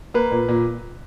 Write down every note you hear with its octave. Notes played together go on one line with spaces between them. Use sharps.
A#3 B4
A#2
A#2